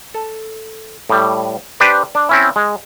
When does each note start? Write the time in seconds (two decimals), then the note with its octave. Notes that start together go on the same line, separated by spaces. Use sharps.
0.14 A4
1.10 A2 G3
1.80 D4 G4 B4 C5 D5
2.15 D4
2.29 C4 C#4 E4
2.56 G#3